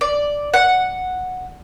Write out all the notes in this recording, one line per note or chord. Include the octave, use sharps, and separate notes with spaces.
D5
F#5